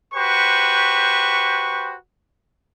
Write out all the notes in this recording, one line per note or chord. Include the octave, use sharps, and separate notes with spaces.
F#4 G4 B4 C5 C#6